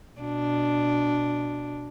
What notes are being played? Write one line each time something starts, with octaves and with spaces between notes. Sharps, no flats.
B2 D4